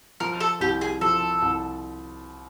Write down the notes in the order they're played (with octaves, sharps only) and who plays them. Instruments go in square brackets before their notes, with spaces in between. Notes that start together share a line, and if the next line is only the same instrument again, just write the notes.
[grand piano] F3 [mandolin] A#4
[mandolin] A4
[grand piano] C2 [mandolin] G4
[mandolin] G#4
[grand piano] F3 [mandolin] A4
[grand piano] C2